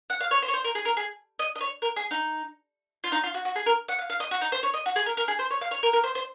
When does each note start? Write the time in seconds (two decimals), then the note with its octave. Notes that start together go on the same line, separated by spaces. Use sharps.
0.10 F#5
0.21 F5
0.31 C#5
0.42 C5
0.48 C#5
0.54 C5
0.64 A#4
0.75 G#4
0.85 A#4
0.97 G#4
1.39 D#5
1.56 D#5
1.61 C#5
1.82 A#4
1.96 G#4
2.11 D#4
3.04 F4
3.12 D#4
3.23 F4
3.34 F#4
3.45 F#4
3.56 G#4
3.66 A#4
3.88 F#5
3.99 F5
4.10 F5
4.20 D#5
4.31 F#4
4.41 D#4
4.52 C5
4.63 C#5
4.74 D#5
4.86 F#4
4.96 G#4
5.06 A#4
5.17 A#4
5.28 G#4
5.39 C5
5.51 C#5
5.61 F5
5.71 C#5
5.83 A#4
5.93 A#4
6.04 C5
6.15 C5